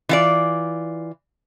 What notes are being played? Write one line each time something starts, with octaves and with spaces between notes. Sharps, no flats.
E3 F4 D5